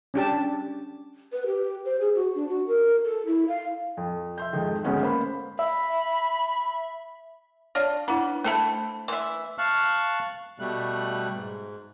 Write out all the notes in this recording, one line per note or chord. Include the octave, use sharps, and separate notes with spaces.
C#4 D4 G4 A5
B4
G4
C5
G#4
F#4
D4
F#4
A#4
A4
E4
F5
F2
E5 C6 G6
F2 G#2 D#3
D2 G#2 B3 C#4 F#5
A#3 C5 B5
E5 B5
D4 F4 C#5
B3 D4 E4
A3 E4 A4 C5 A5
E3 E5 C6
F5 A5 C#6 F6 F#6
B2 G3 A3 F#6
G#2